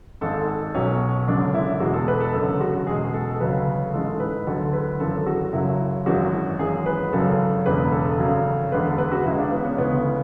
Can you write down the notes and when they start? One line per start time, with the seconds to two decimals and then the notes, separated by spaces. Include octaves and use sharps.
0.21 G#1 G#2 G#3 A4
0.48 A4
0.74 B1 B2 F#3 C#4
1.27 F#1 F#2 D3 G#3 D4
1.54 E4
1.80 E2 B2 G#3 F#4
1.94 A4
2.08 B4
2.21 A4
2.34 F#1 F#2 D3
2.61 F#4
2.87 E2 B2 G#3 G#4
3.14 A4
3.31 A4
3.40 D2 C#3 F#3 B4
3.93 A1 G#2 E3 G#3 A4
4.20 B4
4.47 D2 D3 F#3 A4
4.73 B4
5.00 G#1 F#2 E3 A4
5.26 F#4
5.52 F#1 F#2 C#3 F#3 E4
6.06 G#1 F#2 E3 G#3 F#4
6.59 G#1 F#2 E3 G#3 G#4
6.86 B4
7.13 G#1 F#2 C#3 F#3 A4
7.66 E1 E2 C#3 G#3 B4
7.92 A4
8.19 G#1 F#2 C#3 F#3
8.72 E2 D3 G#3 B4
8.86 A4
8.98 B4
9.12 F#4
9.25 C#2 C#3 G#3 E4
9.38 D4
9.51 B3
9.65 C#4
9.78 D2 C#3 E3 G#3 B3